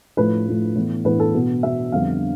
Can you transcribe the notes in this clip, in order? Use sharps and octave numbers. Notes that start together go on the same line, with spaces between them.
A2 F3 A3 B4
A2 F3 A3
A2 E3 B3
A2 E3 B3 B4
A4
B2 B3
B2 B3 E5
F2 D3 G3 B3 F5